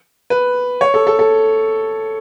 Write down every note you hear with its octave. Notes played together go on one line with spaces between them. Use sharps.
B4
C#5
A4
A4
A4